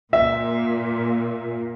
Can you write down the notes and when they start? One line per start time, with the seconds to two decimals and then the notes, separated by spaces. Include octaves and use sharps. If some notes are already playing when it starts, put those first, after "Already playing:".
0.13 A#2 E5